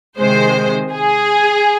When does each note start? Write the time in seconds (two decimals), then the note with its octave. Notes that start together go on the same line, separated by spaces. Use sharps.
0.19 C3 D#3 G#3 C5
0.93 G#4